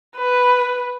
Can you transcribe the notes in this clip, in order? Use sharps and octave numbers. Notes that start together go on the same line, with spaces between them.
B4